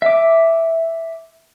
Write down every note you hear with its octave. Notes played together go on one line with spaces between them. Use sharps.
E5 D6